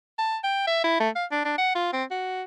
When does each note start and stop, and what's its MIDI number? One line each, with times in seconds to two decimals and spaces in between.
0.18 0.37 81
0.44 0.66 79
0.67 0.82 76
0.84 0.98 64
1.00 1.09 57
1.15 1.25 77
1.31 1.41 62
1.45 1.53 62
1.58 1.71 78
1.75 1.91 65
1.93 2.04 60
2.11 2.43 66